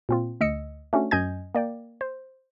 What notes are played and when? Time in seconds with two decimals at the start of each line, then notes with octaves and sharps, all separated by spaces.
0.09 A#2 C4 F4
0.41 D2 D#5 E6 C#7
0.93 A3 C#4 D4 F#4
1.11 F#2 D#5 G#5 G6 G#6
1.55 A#3 D5 G5
2.01 C5